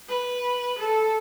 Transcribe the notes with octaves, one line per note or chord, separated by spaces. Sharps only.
B4
A4